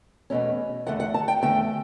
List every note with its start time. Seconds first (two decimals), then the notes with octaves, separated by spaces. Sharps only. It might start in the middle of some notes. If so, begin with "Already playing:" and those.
0.30 E2 B2 A3 C#4
0.86 E2 D3 A3 F#5
1.00 F#5
1.14 A5
1.28 G5
1.42 E2 D3 A3 G5